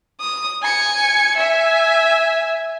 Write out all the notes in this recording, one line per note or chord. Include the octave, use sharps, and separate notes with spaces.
D#6
G#5 C#7
E5 G#5